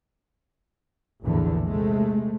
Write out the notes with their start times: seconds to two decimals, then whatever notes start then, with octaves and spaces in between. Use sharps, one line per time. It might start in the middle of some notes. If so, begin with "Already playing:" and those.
1.23 A#1 E2 A2 D3
1.64 C3 G#3 A3